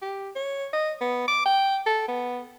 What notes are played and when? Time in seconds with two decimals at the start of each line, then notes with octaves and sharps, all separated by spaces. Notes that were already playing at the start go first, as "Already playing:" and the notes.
0.02 G4
0.35 C#5
0.73 D#5
1.01 B3
1.27 D6
1.45 G5
1.86 A4
2.08 B3